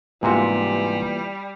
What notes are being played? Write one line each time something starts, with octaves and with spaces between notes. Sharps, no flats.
G#2 C3 E3 G3 A#3 B3 F4 F#4